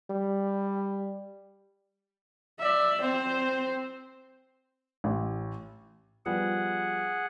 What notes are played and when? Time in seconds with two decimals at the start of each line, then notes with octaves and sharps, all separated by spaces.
0.10 G3
2.59 D5 E5
3.01 C4 C5
5.04 A1
6.26 F3 G3 B3 G#4 F#5